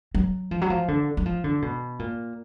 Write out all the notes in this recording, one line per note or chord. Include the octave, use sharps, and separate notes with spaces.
F#3
F3
F#3
F3
D3
F#3
F3
D3
B2
A#2